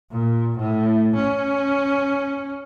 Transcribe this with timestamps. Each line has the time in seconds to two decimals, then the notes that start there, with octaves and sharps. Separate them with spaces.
0.12 A#2
0.58 A2
1.16 C#4